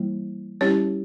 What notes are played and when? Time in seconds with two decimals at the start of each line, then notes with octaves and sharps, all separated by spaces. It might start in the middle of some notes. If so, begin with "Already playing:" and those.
Already playing: E3 G3 A#3 E4
0.61 G3 C#4 E4 G4 C#5